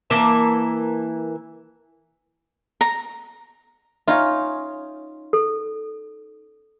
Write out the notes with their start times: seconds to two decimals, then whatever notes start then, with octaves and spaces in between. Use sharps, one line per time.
0.10 E3 A#3 E5 A5
2.81 A#5
4.08 C#4 D#4 F4 E5
5.33 A4